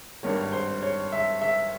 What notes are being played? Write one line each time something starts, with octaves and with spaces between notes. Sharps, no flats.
G#1 G2 D#3 C#5
C5
C#5
E5
E5